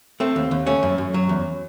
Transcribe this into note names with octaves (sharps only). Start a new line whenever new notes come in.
A3 C4
D#2
D#2
A3 C#4
F#2
F#2
F#3
E2